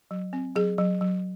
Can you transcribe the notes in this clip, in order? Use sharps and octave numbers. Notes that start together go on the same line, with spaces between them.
F#3
C4
F#3 G#4
F#3
F#3